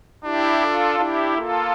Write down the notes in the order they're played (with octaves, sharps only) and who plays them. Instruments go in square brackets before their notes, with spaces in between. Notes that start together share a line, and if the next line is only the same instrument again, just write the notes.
[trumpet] D4 [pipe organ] E4 G4
[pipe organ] F4 A4
[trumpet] D4 [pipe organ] E4 G4
[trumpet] A#3 [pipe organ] F4 A4